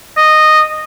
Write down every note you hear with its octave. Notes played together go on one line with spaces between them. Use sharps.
D#5